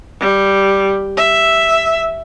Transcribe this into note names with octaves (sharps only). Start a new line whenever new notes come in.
G3
E5